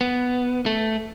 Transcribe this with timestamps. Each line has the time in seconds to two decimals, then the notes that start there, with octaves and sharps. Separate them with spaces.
0.01 B3
0.66 A3